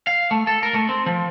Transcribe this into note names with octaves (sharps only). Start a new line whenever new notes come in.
F5
A3
A4
A#4
A3
C4
F3